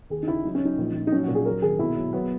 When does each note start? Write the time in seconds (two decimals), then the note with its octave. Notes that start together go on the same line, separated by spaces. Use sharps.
0.10 D#2 G#4
0.23 D#4
0.27 C#3 E4
0.44 F#3 D#4
0.55 C#4
0.62 F#3 D#4
0.78 A#1
0.94 A#1
1.07 D#4
1.12 F#3 C#4
1.24 A#2 F#4
1.35 G#4
1.45 F#3 A#4
1.62 G#1 G#4
1.79 B1 E4
1.96 F#3
2.13 F#3 B3